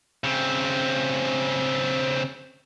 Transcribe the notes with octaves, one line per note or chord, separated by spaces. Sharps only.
C#3 C4